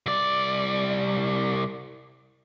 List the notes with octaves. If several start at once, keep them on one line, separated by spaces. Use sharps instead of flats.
C2 D5